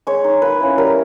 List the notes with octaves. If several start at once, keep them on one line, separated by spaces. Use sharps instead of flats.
G#3 C#5
D#4
A#3 B4
C#4 E4
G3 A#4